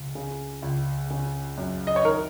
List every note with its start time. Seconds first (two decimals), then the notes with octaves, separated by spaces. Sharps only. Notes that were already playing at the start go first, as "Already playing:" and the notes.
Already playing: C#2
0.15 C#3
0.62 C#2
1.10 C#3
1.58 F#2
1.87 D#5
1.96 C#5
2.04 D#3 A#4